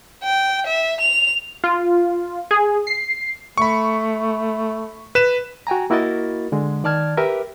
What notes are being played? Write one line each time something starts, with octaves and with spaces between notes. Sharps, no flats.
G5
E5
F7
F4
G#4
C7
A3 B5 C#6
B4 E7
F#4 G5 G#5 A#5
A#3 E4 F#4 A#4 D#5 A6
D3 G#3
D#3 D5 A5 F6 G#6
G4 A#4 B4 E5